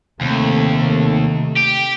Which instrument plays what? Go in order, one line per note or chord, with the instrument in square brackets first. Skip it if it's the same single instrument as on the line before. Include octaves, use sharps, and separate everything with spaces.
[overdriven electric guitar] D#2 [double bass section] C3 A3
[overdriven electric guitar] G4